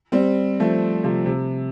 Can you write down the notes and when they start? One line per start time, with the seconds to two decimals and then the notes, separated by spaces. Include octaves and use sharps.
0.12 G3 C4
0.60 F3 A3
1.04 C3 F3
1.26 C3